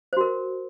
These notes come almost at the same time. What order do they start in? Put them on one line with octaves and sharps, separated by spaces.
C5 F#4 A#4